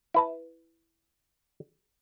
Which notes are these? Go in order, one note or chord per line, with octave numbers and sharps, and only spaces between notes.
E4 B4 A5